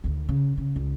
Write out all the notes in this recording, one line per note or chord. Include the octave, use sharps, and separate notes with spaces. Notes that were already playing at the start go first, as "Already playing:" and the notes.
D2 D#3
C#3
C#3
C#2